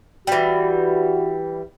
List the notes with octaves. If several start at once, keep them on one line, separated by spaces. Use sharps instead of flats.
E3 G3 F#4